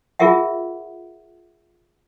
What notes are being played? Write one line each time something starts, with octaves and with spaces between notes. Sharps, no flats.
F4 G#4 A#4 E5 F#5